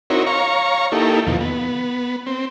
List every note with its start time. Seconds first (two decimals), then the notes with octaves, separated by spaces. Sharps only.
0.10 C4 D#4 E4 F#4 A#4 C#5
0.27 C#5 F5 A#5 C#6
0.92 A#3 D#4 E4 G4 A4
1.27 E2 B2 D#3 F3
1.41 B3
2.26 C4